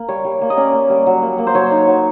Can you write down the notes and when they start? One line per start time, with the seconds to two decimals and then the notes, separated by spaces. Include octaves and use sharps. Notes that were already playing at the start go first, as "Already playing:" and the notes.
Already playing: A#3
0.09 G3 C#5
0.25 G3
0.42 A#3
0.50 D#5
0.57 C#4 D5
0.73 A#3
0.90 G3
1.07 F#3
1.22 A#3
1.38 A#3
1.47 C5
1.55 F#3 C#5
1.71 D#4
1.88 F#3